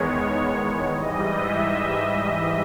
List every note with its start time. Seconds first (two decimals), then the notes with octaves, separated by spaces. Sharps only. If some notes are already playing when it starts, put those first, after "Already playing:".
Already playing: E2 D#3 G#3 B3 C#5
0.92 G#2 E3 G3 D#5
1.31 E5
1.68 D#5
2.07 D#5